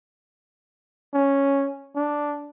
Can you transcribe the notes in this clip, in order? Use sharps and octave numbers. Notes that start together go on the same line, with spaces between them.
C#4
D4